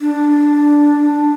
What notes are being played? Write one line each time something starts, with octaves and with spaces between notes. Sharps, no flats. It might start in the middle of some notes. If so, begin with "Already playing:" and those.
D4